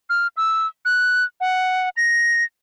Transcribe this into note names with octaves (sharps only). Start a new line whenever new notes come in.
F6
E6
F#6
F#5
A#6